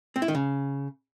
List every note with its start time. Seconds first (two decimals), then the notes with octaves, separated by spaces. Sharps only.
0.16 C4
0.22 E4
0.28 D#3
0.35 C#3